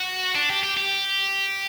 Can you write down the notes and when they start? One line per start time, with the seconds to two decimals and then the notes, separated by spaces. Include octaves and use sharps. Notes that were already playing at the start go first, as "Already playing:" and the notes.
Already playing: F#4
0.35 D4
0.50 G4
0.63 G4
0.77 G4